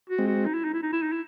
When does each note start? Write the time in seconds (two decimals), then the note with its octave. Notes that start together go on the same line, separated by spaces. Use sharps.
0.09 F#4
0.18 G#3 C4
0.27 F#4
0.46 D#4
0.54 E4
0.65 D#4
0.73 E4
0.82 D#4
0.92 E4
1.03 D#4
1.12 E4